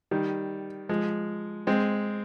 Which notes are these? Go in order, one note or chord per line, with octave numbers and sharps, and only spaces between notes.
D#3 G3
F3 G#3
G#3 C4